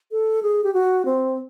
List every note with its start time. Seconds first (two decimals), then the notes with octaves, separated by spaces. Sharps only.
0.11 A4
0.42 G#4
0.64 G4
0.74 F#4
1.05 C4